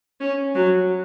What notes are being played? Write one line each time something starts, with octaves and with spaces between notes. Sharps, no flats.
C#4
F#3